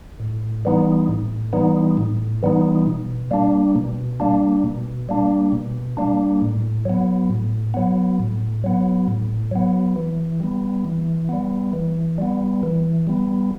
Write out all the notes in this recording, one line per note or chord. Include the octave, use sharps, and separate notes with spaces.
A2
E3 G3 B3 D#4
A2
E3 G3 B3 D#4
A2
E3 G3 B3 D#4
B2
G3 A#3 D4
B2
G3 A#3 D4
B2
G3 A#3 D4
B2
G3 A#3 D4
A2
F#3 B3
A2
F#3 B3
A2
F#3 B3
A2
F#3 B3
E3
G3 B3
E3
G3 B3
E3
G3 B3
E3
G3 B3